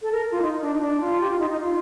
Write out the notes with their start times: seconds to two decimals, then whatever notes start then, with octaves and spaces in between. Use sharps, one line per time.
0.02 A4
0.12 A#4
0.32 F4
0.42 D#4
0.61 D4
0.74 D#4
0.81 D4
1.00 F4
1.20 G4
1.30 F4
1.40 D#4
1.50 D#4
1.60 F4